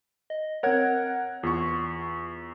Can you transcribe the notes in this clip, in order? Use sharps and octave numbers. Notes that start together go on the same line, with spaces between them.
D#5
C4 A#4 C#5 F#5 G#6
E2 F4 C#6